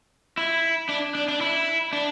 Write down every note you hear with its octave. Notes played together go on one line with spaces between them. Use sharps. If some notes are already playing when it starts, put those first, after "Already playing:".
E4
D4
D4
D4
E4
D4